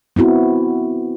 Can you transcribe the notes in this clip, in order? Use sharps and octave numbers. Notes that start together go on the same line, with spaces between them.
B3 C4 E4 F#4